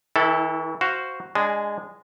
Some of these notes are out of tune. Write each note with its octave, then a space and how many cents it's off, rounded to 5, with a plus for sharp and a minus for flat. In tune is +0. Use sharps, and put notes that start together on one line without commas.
E3 -45 E4 -5 A4 +0
F#4 +5 C5 +0 F5 -5
G#3 -15 D4 +0 G#5 +15